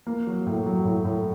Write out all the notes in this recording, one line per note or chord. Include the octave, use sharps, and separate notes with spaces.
A#3
F#3
A2
F#3
A2
A2